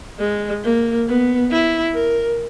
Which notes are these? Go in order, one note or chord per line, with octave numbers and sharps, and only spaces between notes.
G#3
A#3
B3
E4
A#4